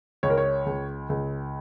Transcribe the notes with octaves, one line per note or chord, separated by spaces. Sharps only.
C#2 C#5
A#4
C#5
C#2
C#2